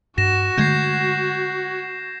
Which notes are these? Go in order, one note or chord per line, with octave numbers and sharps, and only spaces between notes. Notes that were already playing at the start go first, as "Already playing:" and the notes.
G2 F#4 A#6 E7
D3 G#3 A3 G6 G#6 C7